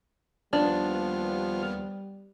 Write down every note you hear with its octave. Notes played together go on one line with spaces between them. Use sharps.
D#2 F3 G3 B3 D4 F6